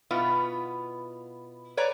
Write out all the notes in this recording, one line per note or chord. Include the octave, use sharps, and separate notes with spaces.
B2 B3 E4 F4
B4 C#5 D5 A#5